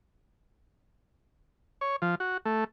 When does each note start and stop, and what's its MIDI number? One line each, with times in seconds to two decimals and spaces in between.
1.81 1.96 73
2.02 2.15 53
2.20 2.37 66
2.45 2.64 57